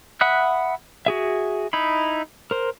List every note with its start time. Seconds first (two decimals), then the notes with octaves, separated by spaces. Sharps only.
0.21 E5 F#5 B5 D#6 F#6
1.06 F#4 G#4 E5
1.73 D#4 E4 B5
2.51 A#4 C5